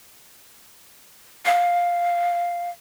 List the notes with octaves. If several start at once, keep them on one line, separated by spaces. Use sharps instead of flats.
F5